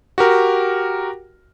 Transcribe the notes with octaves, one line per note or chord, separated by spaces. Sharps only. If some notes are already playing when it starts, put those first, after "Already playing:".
F#4 G4 A#4